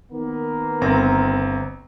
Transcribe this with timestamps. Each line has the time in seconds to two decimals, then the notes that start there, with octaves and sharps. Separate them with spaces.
0.11 D#3 A#3 B3
0.81 G1 C4 A#5